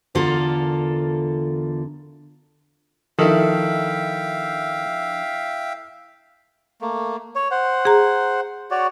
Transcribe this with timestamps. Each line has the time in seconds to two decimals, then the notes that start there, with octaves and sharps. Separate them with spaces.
0.15 E2 D3 F4 A4 A#4
3.19 D#3 F3 D4 E4 A4 E5 F5 G5
6.81 A3 A#3
7.35 C#5
7.51 C5 F#5
7.85 G#4 A#5
8.71 F#4 C#5 D5